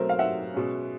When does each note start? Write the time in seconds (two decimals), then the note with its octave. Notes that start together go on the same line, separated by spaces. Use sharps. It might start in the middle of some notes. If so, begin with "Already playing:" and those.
Already playing: B2 F#3 A3 C4 A#4 C5
0.09 F5
0.19 E5 F#5
0.54 B2 G#3 C#4